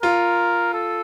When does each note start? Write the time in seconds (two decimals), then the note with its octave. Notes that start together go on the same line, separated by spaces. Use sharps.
0.02 F4 A#4
0.74 A4